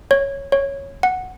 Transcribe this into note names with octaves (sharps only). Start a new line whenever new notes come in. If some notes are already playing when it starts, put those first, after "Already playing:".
C#5
C#5
F#5